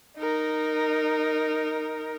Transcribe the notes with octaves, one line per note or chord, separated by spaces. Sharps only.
D#4 A#4